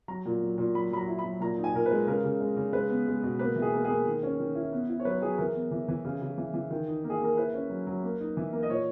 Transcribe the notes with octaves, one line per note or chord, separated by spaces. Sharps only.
F#3 A#5
A#2
F#3
A#2
F#3 B5
F#3 B5
A#5
E4
B5
F#3
A#2 A#5
D#4
G#5
A#2 A#4
B4
G#3
C#3 A#4
C#3
G#3
C#3
G#3 B4
B3
G#3
B2
A#3 B4
E3
G#4
A#3
A#3 G#4
D#3
C#4
D#3
E4
B3
E4
C#5
F#3 B4
F#3 G#4
E3 A#4
B3
E3
E3
C#3
C#3
E3
E3
D#3
D#4
A#3
G#4
A#3 A#4
E4 B4
C#4
F#3
F#3
A#3
D#4
E3
A#3
D#5
A#2 C#5